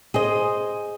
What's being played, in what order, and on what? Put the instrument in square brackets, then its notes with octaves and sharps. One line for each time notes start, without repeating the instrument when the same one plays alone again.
[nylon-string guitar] G#4 C5 D#5